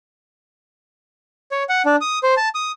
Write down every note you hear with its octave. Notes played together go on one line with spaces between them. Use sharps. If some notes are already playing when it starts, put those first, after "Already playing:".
C#5
F#5
D4
D#6
C5
A5
D#6